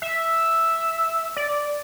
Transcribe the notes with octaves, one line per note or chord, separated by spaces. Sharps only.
E5
D5